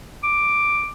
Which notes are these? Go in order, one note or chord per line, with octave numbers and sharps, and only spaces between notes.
D6